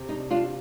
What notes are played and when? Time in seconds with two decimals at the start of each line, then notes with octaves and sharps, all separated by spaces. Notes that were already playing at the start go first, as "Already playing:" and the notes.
Already playing: C3
0.09 D4 D#4
0.31 D4 F4